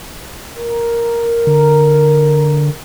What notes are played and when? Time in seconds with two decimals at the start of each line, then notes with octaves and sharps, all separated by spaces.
0.57 A#4
1.47 D3